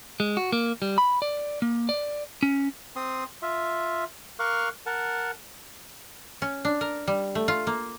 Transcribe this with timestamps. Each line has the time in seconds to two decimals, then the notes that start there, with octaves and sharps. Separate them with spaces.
0.20 G#3
0.37 F#4
0.53 A#3
0.82 G3
0.98 B5
1.22 D5
1.62 A#3
1.89 D5
2.43 C#4
2.96 C4 C6 D#6
3.42 F4 E5
4.39 A#4 F5 C#6 D6 F#6
4.86 A#4 F#5 A5
6.42 C#4
6.65 D4
6.81 A#4
7.08 G3
7.35 A3
7.48 F4
7.67 A#3